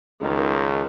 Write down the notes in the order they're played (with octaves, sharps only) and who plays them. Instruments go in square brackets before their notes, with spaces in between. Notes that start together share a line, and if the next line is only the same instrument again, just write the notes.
[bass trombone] C#2 [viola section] D#3